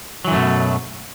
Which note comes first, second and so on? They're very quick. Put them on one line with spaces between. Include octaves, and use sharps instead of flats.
F#3 E3 F#2 A3 B2